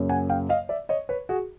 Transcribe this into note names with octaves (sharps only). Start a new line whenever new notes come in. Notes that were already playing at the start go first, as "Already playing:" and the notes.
Already playing: F#2 C#3 F#3 A#3
F#5 G#5
F5 G5
D#5 F5
D5 E5
C#5 D#5
B4 C#5
F#4 G#4